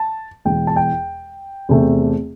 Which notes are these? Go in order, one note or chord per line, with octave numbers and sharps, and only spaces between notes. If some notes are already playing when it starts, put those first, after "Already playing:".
Already playing: A5
E1 E2 E3 G5
A5
G5
E2 C3 A3